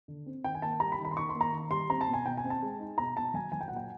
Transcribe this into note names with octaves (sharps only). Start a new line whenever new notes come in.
D3
C4
D#3 G5
G#5
A#3 A5
G3 A#5
B5
D#3
B5
C6
D#3 C#6
C6
A#3
A#5
D#3
G3 C6
C4 A#5
A5
B2
G#5
B2 G5
G#5
C4
A5
G#3
D#4
B2 A#5
B2 A5
F#3 G#5
F#3 G#5
G5
A#2 F#5
G5